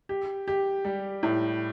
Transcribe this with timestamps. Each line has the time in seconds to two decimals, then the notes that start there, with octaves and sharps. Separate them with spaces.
0.09 G4
0.48 G4
0.85 G3
1.23 A2